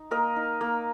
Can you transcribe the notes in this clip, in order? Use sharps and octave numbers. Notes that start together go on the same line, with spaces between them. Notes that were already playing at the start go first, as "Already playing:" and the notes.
Already playing: D#4
A#3 A#4 D#5
D#4
A#3